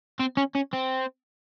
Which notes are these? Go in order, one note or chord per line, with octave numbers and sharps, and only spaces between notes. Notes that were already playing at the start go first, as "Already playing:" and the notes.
C4
C#4
C#4
C4